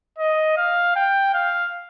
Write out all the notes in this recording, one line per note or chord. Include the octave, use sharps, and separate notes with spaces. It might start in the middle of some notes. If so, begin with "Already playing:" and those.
D#5
F5
G5
F5